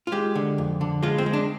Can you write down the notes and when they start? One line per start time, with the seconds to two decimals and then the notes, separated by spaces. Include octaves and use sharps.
0.07 F4
0.12 G#3 G4
0.36 D3
0.58 F2
0.81 D3
1.03 G#3 F4
1.18 C4
1.26 G#3
1.33 D4